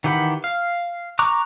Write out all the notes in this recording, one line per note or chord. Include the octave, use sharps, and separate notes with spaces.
D#3 E3 G4 F#5 B5
F5
A#5 C#6 D6 F#6